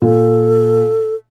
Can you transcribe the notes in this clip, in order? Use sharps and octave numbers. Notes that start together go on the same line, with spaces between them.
A#2 A4